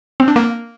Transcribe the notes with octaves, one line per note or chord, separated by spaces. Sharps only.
C4
D4
A#3